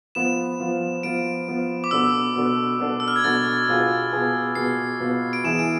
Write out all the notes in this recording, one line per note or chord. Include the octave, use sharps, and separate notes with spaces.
F3 B3 F4 E7
F3 B3 F4
F3 B3 F4 D7
F3 B3 F4
D6
B2 B3 D4 A4 E6
B2 B3 D4 A4
B2 B3 D4 A4
E6
F6
G#6
B2 B3 D4 A4 A6
B2 B3 F4 G#4 B4
B2 B3 F4 G#4 B4
B2 B3 F4 G#4 B4 C7
B2 B3 F4 G#4 B4
D7
E3 B3 E4 G#4 E7
D7